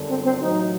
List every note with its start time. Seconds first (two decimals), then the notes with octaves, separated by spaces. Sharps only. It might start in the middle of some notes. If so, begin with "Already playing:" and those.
Already playing: G1 F#2 D3
0.09 C4
0.24 C4
0.40 A1 A2 F#3 D#4